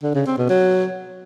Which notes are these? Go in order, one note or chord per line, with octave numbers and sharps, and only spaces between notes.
D3
C#3
C4
B2
F#3